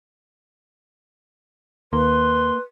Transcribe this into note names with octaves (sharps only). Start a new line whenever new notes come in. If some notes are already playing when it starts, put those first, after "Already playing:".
D#2 A#3 B4 C6